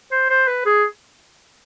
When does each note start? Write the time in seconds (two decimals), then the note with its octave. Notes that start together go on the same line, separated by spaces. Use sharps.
0.12 C5
0.30 C5
0.48 B4
0.66 G#4